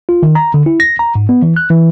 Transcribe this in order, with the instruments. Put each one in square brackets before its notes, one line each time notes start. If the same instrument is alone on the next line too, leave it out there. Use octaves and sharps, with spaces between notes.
[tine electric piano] F4
D#3
A#5
D3
E4
A#6
A#5
G#2
B3
E3
F#6
E3